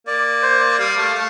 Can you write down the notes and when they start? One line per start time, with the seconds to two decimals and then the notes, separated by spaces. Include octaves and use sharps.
0.06 A#3 D5
0.42 C5
0.61 D5
0.79 G3 F5
0.97 A3
1.14 A3